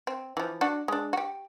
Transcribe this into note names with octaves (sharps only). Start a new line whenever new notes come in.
C4
E3 F3
D4 F#4
G#3 D4
F#4 G4